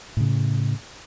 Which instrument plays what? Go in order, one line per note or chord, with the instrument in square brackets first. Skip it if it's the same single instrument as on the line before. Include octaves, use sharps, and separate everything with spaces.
[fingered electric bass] A2 C#3